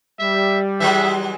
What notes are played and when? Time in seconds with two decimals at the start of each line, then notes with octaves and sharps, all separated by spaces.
0.20 G3 E5
0.80 E3 F#3 G#3 E5